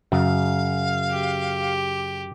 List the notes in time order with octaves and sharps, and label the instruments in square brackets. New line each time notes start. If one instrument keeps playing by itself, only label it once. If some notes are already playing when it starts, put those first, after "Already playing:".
[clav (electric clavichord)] F#2 [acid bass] C#3 [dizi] F5
[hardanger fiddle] G4